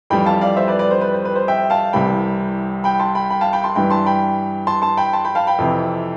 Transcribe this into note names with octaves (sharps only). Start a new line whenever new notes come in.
F2 E3 G3 G5 B5
F5 A5
D5 F5
C5 E5
B4 D5
B4 D5
C5
B4
C5
B4
C5
E5 G5
F5 A5
C2 C3 E3 G3 G5 B5
G5 B5
A5 C6
G5 B5
G5 B5
F5 A5
G5 B5
A5 C6
G2 E3 G3 G5 B5
A5 C6
G5 B5
A5 C6
A5 C6
G5 B5
A5 C6
G5 B5
F5 A5
G5 B5
F2 C3 E3